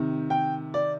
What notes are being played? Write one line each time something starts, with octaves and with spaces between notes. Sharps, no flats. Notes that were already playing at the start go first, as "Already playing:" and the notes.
Already playing: C3 D#3
G5
D5